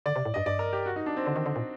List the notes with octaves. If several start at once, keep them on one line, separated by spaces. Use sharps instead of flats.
D3 D5
C3
A2
G2 D#5
G2 D5
A#4
G4
F#4
D#4
D4
C4
D3
D#3
D3
A#2